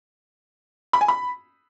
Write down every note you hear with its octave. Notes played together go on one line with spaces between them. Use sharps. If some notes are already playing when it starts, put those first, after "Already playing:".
B5
G#5
B5